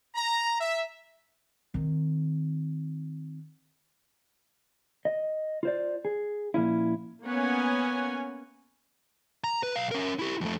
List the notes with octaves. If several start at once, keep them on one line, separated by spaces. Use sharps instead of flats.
A#5
E5
D#3 C4
D#5
F4 C5 D5
G#4
A#2 F3 C#4 E4
A#3 B3 C#4 C#5 F#5 G#5
A#5
B4
B1 F5
C#4 A#4
E4 G4
F2 A3